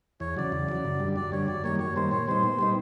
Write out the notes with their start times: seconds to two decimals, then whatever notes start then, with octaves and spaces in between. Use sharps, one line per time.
0.20 E2 C#5
0.37 C#3 F#3 D5
0.52 E2
0.69 C#3 F#3
0.85 F#2
1.00 D3 G3
1.16 F#2 D5
1.32 D3 G3 C#5
1.48 F#2 D5
1.64 D#3 G3 A#3 C#5
1.79 F#2 C#5
1.96 D#3 G3 A#3 C5
2.11 A#2 C#5
2.28 G3 B3 D#4 C5
2.43 A#2
2.59 G3 B3 D#4